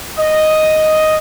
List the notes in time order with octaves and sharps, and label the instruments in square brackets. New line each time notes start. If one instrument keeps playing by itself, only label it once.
[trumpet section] D#5